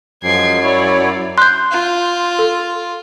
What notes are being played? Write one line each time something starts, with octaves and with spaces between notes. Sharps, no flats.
F#2 F3 G#3 G#6 C7
F#3 E4 C#5 D5
C6 F#6 G6
F4
A4